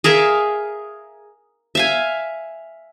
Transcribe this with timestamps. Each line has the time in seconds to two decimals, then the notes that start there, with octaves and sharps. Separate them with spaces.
0.04 G#4 A#4 E5 F5
1.75 E5 F5 G#5